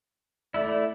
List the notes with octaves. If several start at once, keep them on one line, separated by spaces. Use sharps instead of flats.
A3 E4 D5